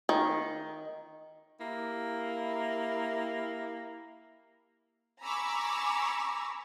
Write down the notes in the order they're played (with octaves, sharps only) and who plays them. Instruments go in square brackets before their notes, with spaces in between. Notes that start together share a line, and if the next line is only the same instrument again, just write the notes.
[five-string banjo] D#3
[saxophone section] A#3 E4 G4
[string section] G#5 A#5 B5 C#6 D6 E6